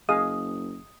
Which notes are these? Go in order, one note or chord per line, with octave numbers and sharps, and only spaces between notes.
F#1 G#4 D#5 F5 D#6